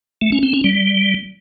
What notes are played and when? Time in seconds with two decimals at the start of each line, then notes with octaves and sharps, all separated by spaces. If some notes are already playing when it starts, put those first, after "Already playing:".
0.21 A3
0.32 C#4
0.43 C4
0.53 C#4
0.64 G3